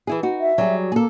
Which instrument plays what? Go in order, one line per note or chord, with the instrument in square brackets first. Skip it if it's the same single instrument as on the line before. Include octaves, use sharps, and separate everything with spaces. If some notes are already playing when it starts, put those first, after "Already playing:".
[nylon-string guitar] E3 E4 G#4
D#4 F#4
[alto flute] E5
[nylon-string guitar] F#3 G3 G#4
[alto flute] A#3 [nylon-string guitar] G#4 A4